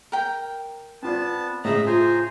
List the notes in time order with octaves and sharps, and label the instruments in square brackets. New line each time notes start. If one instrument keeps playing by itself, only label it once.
[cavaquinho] A#4 G5
[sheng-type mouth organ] B3 A5 [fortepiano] C4 F4 D5
[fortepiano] A2 C#3 E4 [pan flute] G#4 [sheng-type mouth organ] D#5 E5 A#5
[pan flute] F4 [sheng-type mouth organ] C5 G#5 A#5